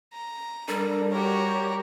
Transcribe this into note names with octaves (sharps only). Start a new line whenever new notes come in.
A#5
G3 D4 A4 A#4
F#4 G4 A#4 C#5 A#5